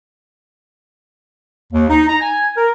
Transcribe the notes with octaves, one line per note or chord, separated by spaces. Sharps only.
D#2
D#4
A#5
G#5
A#4